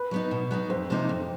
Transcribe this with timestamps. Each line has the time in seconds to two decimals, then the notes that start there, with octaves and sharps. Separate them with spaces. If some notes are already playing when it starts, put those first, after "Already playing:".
Already playing: B4
0.11 F#3 B3 D#4
0.31 B2
0.51 F#3 B3 D#4
0.70 F2 C5
0.90 C3 F3 A#3 D#4
1.09 F2